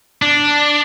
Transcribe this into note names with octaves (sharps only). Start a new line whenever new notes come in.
D4